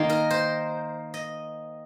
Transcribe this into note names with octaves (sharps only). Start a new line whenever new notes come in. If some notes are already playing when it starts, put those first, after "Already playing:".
Already playing: D#3 A#3 D#4 C6
A#4
C5
D#5